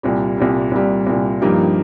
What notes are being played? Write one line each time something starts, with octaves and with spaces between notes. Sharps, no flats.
C2 A#2 G3
C2 A#2 G3
C2 A#2 G3
C2 A#2 G3
G2 F3 A#3 D#4 G4